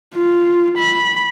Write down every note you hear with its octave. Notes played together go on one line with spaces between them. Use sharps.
F4
B5